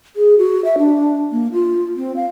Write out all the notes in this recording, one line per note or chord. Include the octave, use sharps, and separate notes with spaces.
G#4
F#4
E5
D4
A#3
F4
C4
F5